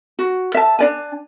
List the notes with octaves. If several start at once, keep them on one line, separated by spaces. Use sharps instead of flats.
F#4
E5 A5
D4 D5 G#5